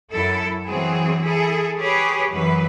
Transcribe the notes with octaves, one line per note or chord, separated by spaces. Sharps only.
F#2 E4 A4
E3 F#3 C4 G#4
E4 G#4 A4
G4 G#4 B4 C#5
F#2 E3 F#3 B4